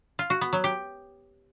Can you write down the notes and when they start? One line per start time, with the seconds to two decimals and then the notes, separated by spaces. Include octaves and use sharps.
0.19 F4
0.30 F#4
0.41 B3
0.53 F#3
0.64 G4